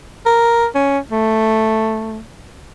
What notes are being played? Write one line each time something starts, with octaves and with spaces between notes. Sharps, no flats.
A#4
C#4
A3